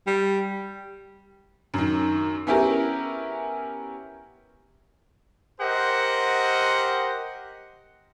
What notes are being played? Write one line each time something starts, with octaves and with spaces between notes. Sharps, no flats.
G3
F#2 D#3
B3 C#4 E4 G4 G#4 A#4
G4 A#4 C5 D#5 F#5